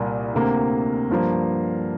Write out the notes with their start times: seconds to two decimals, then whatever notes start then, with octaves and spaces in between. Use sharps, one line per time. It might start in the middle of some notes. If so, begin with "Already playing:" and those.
Already playing: C2 A#2 A#3
0.34 D2 C3 A#3
1.11 G2 F3 A#3